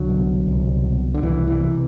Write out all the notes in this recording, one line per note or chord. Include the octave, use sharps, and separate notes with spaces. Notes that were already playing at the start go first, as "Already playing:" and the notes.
Already playing: C2 D3 F#3
B2
C2
B2
D3
C2 E3
E3
C3